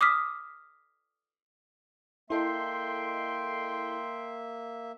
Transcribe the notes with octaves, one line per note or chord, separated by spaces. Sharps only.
D6 D#6 F6 B6
A#3 E4 A4 D#5 E5 G5 C6